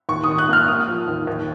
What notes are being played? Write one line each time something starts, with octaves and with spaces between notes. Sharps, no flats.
D#2 C#6
D#6
D#3
F#6
A#3 F6
A#3 D#6
F3
D#2
D#2